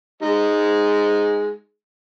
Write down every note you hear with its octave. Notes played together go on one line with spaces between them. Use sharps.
G#3 D#4